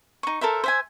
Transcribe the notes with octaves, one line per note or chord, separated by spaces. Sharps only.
D#4 C#6
A4 A#4 C5 E5
C5 E5 G#5